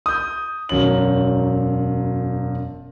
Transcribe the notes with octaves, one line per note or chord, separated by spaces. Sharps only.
D#6 G6
E1 F#2 C#5 F#7